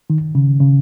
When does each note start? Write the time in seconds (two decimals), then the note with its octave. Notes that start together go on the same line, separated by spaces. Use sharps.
0.10 D#3
0.35 C#3
0.60 C#3